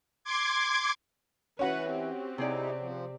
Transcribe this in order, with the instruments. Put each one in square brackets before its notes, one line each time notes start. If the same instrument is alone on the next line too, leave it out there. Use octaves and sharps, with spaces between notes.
[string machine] C6 D6 G#6
[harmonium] E3 [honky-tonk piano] C#4 F#4 [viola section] B4 F#5
[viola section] C4 G4
[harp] C3 G#4 D5 [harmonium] D#4 E4
[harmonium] F3